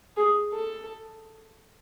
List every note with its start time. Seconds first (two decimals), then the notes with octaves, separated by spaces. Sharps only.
0.17 G#4
0.53 A4